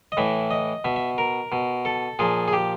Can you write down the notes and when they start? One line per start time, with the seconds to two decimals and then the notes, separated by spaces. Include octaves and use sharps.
0.12 D#5
0.17 A2 E3 E5
0.51 D#5
0.84 B2 E5
0.96 E5
1.18 A#4
1.52 B2
1.85 A4
2.19 A#2 F3 G#4
2.48 G#4
2.53 G4